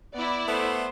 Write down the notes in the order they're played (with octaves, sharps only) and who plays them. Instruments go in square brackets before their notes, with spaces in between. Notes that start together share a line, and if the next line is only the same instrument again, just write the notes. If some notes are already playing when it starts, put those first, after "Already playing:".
[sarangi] B3 [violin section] E4 D5
[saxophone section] A3 B3 [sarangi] C5